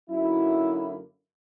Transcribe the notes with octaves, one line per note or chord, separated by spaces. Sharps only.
F#2 D3 F#3 A#3 D#4 E4